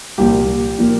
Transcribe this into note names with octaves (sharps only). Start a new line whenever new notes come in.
C2 A#2 F3 A#3 G4
A#2 F3 A#3